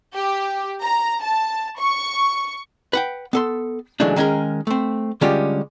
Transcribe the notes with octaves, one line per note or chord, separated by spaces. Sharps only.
G4
A#5
A5
C#6
B4 F#5 G5
B3 A4 C6
C#3 E3 F#3 G#3 A3 D4
D#3 G#3 C#4 G#4 A#4
A3 C4
D3 G3 G#3 C#4 F4 G4